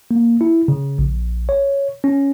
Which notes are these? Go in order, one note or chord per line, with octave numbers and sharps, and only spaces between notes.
A#3
E4
C#3
A#1
C#5
C#4